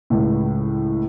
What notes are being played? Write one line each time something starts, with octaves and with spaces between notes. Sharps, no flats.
C#2 A2